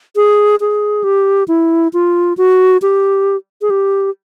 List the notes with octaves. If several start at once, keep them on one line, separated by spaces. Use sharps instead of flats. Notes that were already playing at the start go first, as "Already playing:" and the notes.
G#4
G#4
G4
E4
F4
F#4
G4
G#4
G4